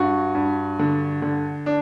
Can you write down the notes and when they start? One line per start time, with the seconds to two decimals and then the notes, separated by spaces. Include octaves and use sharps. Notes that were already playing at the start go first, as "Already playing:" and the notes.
Already playing: G2 F#4
0.35 G2
0.79 D3
1.22 D3
1.66 D4